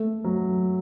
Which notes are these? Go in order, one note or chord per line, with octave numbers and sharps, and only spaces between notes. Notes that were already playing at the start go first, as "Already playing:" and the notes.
Already playing: A3
F#3